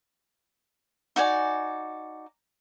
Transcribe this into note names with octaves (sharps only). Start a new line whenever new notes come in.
D#4 F#4 D5 G#5